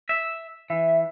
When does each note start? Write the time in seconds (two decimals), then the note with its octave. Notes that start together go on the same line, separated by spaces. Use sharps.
0.09 E5
0.70 E3 E5